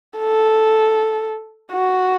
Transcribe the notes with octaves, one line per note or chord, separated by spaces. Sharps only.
A4
F#4